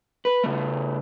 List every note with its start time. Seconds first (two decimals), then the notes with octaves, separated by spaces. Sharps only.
0.25 B4
0.44 C#3 A3